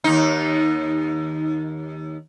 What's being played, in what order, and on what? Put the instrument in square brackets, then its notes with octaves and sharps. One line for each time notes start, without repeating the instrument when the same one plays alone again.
[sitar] D#2 D#4